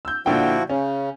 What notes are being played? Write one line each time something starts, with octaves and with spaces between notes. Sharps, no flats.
E6 G6
A#2 D3 F3 E4 F#4 G5
C#3 C#4